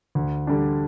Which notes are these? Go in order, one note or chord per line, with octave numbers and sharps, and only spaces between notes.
D2
D3 G3 D4